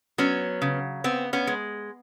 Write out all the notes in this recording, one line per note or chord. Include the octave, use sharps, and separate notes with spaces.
F#3 B3 C#4
C#3
B3 C4
B3 C#4
G#3